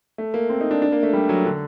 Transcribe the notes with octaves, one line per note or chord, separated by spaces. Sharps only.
A3
A#3
C4
D#4
D4
D4
A#3
A3
G3
F#3
D3